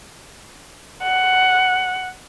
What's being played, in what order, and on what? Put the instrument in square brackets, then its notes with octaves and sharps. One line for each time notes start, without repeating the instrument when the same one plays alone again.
[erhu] F#5